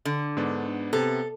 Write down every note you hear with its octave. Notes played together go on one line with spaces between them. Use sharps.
D3
G#2 B3 D4
C3 B3 A4